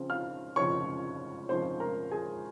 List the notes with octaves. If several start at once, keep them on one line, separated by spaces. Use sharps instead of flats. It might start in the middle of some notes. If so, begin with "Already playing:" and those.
Already playing: C#3 F3 C4
F5 F6
C#3 F3 C4 D#4 C#5 C#6
C#3 F3 C4 D#4 C5 C6
A#4 A#5
G#4 G#5